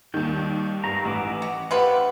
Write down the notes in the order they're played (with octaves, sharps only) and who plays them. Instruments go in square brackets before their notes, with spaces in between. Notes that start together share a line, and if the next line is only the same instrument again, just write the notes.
[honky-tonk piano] D#2 D#3 [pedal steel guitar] G3 G6
[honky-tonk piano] G2 [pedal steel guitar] A#5
[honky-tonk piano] A1 [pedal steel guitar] E3 B4 D6
[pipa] F#4
[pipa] F3 D4 B4 [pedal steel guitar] G4 F#5 [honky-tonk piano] E5